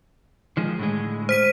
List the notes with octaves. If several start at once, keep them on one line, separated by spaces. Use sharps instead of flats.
D#3 F3 G#3
A2 D3 G#3
C5 B6 D#7